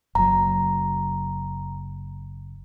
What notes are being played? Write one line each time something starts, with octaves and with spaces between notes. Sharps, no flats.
F#1 F#3 A#5